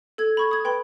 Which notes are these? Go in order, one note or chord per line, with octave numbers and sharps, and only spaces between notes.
A4 G#6
B5 C#6 G#6
D#6 G#6
B4 G5 B5 C6